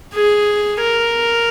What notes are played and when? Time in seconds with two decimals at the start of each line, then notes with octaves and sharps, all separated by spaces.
0.15 G#4
0.81 A#4